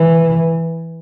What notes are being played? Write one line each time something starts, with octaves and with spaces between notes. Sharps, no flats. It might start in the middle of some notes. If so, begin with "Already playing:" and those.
Already playing: E3